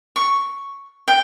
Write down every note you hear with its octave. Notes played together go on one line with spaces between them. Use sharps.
C#6
G5